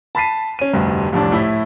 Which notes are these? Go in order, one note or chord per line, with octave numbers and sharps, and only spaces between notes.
A5 B5 A6 B6 C7 D#7
C#4 D#7
F1 D2 G2
C2 F2 A2 D4
A2 E4